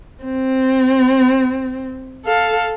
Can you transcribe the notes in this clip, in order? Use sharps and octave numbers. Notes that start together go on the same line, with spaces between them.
C4
A4 F5